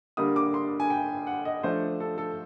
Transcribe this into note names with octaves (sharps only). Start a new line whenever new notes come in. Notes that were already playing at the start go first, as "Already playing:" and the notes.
D3 G3 A#3 D#6
D6
C6
G#5
G5
F#5
D#5
F3 A3 D4 C5
A4
A4